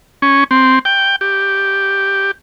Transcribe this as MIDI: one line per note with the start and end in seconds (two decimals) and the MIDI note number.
0.22 0.44 61
0.51 0.79 60
0.85 1.16 79
1.21 2.31 67